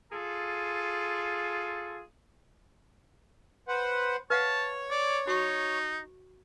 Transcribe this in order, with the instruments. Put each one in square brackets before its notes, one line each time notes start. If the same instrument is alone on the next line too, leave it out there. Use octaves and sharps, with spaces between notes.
[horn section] F4 G#4 A4
[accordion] B4 C5 F#5
[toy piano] B4 F5 F#5 [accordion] C#5 [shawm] A5
[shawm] D5
[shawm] D#4 [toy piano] F#4 C#6